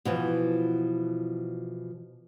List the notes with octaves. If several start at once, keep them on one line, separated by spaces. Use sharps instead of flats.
B2 E3 F3